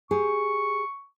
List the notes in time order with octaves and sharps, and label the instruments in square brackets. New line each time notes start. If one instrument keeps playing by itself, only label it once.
[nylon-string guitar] G4 G#4 [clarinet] C#6